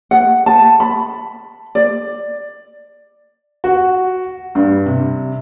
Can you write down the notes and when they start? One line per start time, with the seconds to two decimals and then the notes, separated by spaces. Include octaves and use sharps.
0.11 F#5
0.46 A5
0.80 B5
1.75 D5
3.64 F#4
4.55 G2
4.86 C3